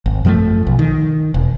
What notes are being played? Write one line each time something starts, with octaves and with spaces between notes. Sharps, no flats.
G#1
F#2 F3 G3 A3
B1
D#3
E1